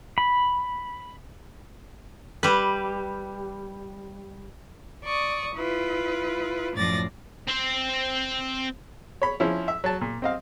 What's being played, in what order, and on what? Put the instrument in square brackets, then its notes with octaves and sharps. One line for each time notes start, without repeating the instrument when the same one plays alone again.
[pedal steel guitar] B5
[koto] G3 B4
[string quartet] D5 C#6 D#6
E4 F4 B4
F#2 A2 F3 D5 A6 A#6
[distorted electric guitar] C4 C5
[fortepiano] C#5 B5
F3 C#4 E4
E5
F#3 A5
A#2
C4 D#5 F5